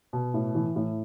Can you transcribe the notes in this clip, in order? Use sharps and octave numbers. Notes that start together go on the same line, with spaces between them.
B2
A2
E3
A2